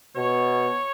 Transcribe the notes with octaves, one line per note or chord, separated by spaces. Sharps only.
B2 C#5